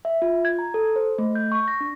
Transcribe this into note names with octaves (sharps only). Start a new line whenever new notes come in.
E5
F4
G#6
A#5
A4
C5
A3
G6
C#6
A#6
D4